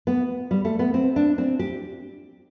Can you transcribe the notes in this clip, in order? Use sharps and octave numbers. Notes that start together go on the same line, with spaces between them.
B3
G3
A3
B3
C4
D4
C4
G4